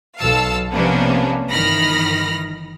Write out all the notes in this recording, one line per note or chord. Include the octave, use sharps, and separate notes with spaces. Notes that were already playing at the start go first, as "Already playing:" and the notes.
B1 A4 F5 A5 E6
C3 F3 A#3 B3 C#4 D4
G1 D#3 E3 B5 F6 A#6